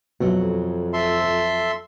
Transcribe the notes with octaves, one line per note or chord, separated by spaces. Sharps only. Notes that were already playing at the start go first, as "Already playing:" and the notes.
F2 B2 F#3 A3
A4 E5 C6